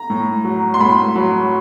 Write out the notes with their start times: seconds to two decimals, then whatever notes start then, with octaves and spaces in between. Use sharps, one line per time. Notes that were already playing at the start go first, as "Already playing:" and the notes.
Already playing: A#5
0.10 A2
0.44 F#3
0.74 C6
0.80 A2 B5
1.16 F#3